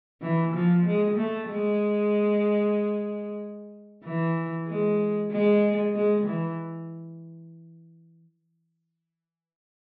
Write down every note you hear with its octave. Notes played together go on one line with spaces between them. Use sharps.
E3
F3
G#3
A3
G#3
E3
G#3
G#3
G#3
E3